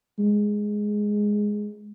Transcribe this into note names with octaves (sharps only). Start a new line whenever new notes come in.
G#3